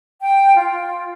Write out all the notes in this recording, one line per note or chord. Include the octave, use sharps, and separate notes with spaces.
G5
F4